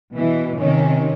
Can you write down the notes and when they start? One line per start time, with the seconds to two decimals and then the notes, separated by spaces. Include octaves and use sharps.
0.15 B2 E3
0.58 C3 D#3 C#4